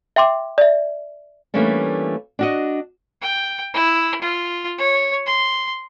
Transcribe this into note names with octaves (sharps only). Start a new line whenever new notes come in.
E5 G5 C6 D6
D5 E5
E3 G3 A3 A#3 C#4 D4
D4 F#4 D#5
G5
E4
F4
C#5
C6